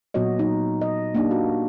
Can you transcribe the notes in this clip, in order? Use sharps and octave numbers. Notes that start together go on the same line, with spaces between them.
A#2 F#3 B3 F#4 C#5 D#5
F#3 D#4
D#5
A#3 D4 D#4 G4
F#4